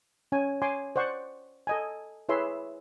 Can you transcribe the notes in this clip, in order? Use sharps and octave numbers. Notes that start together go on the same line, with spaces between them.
C#4 C#5 G#5
C#5 G#5 C6 D6
C5 D5 F#5 C#6
A4 D#5 G#5
E4 G#4 B4 C#5 E5 C6